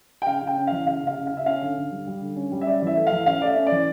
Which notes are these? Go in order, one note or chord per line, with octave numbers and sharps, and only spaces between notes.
G5
C#3 F5
C#3
G5
C#4
E3 F5
C#3 F5
C#3 F5
C#3
F5
C#3
E5
C#4 F5
D3
D3
G3
G3
D3
C#4
G3
E5
C#4 D5
E3 E5
A3
F5
E3
C#4 F5
A3 D5 E5
C#4
D5
E3